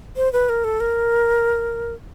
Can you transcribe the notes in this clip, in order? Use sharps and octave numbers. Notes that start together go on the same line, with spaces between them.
C5
B4
A#4
A4
A#4